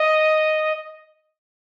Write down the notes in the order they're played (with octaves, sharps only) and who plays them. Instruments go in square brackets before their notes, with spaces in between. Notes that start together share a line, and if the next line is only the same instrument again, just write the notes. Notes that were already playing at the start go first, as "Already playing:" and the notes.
Already playing: [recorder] D#5